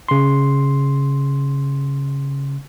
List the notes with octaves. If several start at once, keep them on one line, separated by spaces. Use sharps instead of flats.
C#3 C6